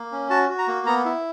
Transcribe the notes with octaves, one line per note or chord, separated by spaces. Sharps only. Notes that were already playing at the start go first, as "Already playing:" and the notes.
Already playing: A#3
C#4
F#4 A5
F#4
A#5
A#3
B3 A#5
E4